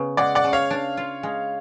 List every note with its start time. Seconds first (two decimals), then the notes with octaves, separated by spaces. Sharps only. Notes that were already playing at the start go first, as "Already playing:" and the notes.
Already playing: C#3 B3
0.17 G#3 D5 F#5
0.35 D5 F#5
0.44 C#3
0.53 C#5 F5
0.70 D4
0.97 F4
1.23 G#3